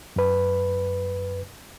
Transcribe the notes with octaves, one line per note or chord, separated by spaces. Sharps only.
F#2 B4